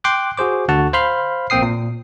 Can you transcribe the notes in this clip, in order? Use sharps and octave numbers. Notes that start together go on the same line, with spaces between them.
G5 C6 D6 F#6
F#4 G#4 C5 D6
D2 D3 F#4 F#5 A5
C5 F5 B5 C6 F6
A#1 A#3 C4 G5 D#6 C7
A#2